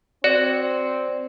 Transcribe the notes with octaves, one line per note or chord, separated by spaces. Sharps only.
C4 F#4 D5